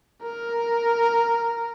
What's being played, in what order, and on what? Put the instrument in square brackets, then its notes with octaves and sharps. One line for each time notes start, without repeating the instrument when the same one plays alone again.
[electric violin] A#4